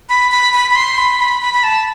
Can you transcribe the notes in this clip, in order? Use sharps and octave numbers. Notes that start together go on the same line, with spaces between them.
B5
B5
B5
B5
C6
B5
B5
B5
B5
A5